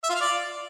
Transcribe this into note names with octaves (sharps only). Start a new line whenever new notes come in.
E5
F4
F5
D5